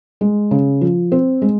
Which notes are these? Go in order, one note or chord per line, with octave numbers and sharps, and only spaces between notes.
G#3
C#3
F3
C4
G#3